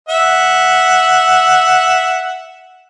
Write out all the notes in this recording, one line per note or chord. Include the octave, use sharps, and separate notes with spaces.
E5 F#5